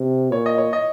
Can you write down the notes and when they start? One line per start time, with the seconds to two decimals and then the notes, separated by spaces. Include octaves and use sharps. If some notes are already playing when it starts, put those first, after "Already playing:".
Already playing: C3
0.32 A#2 C#5
0.46 D#5
0.58 C#5
0.73 D#5